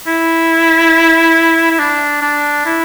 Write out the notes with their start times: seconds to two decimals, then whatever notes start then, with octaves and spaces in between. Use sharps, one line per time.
0.07 E4
1.71 E4
1.79 D4
2.21 D4
2.65 E4